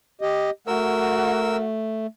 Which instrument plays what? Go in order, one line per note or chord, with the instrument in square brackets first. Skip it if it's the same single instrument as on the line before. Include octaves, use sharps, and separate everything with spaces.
[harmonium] G4 D#5
[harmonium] A3 [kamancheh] F#4 F#5 [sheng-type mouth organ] A#4 E6